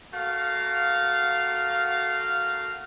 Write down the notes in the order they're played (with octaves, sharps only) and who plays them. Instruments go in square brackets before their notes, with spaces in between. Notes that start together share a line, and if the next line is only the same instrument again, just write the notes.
[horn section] A3 A#3 F#4 F5